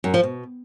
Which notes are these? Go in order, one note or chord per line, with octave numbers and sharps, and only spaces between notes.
F#2
F3
B2